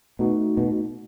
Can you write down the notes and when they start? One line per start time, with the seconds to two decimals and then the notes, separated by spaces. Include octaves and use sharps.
0.19 B2 A3 D#4 F#4
0.57 B2